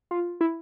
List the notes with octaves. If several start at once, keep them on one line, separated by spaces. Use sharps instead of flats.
F4
E4